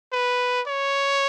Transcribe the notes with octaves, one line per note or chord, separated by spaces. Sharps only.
B4
C#5